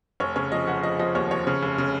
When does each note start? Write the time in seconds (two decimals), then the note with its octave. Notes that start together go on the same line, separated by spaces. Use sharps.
0.20 F1 C#5
0.36 C#3 C#5
0.52 F3 D#5
0.68 F1 F#5
0.83 F3 D#5
0.99 F3 D#5
1.15 D#2 C#5
1.31 F3 C#5
1.47 C#3
1.63 F1
1.78 C#3